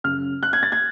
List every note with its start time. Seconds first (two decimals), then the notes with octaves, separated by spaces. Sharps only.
0.04 F#2 C#3 F6
0.43 F#6
0.53 G#6
0.63 A6
0.72 G#6